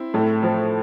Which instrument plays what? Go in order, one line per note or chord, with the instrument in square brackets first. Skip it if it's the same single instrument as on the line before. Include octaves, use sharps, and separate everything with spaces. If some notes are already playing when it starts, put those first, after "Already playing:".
Already playing: [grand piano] C4 E4
[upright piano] A2
F3